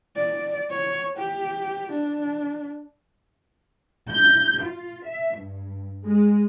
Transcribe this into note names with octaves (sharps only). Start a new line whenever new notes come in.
D5
C#5
G4
D4
G6
F4
E5
G2
G#3